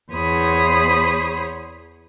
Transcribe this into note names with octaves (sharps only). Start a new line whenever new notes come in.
E2 C5 C#5 B5 D#6